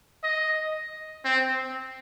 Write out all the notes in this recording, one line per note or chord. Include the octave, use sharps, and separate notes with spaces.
D#5
C4